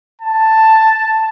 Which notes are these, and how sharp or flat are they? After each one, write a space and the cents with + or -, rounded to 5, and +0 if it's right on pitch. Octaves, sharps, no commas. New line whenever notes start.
A5 +5